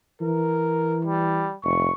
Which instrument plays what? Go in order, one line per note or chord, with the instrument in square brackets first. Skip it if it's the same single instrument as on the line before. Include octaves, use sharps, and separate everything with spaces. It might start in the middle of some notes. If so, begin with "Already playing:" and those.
[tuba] E3 [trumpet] A#4
[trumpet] G3
[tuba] F1 [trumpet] C#6